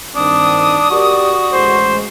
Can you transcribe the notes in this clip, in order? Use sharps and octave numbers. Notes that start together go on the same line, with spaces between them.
G2 D#3 C4 D4 D#6
F#4 G4 A#4 D5
A1 G#3 C5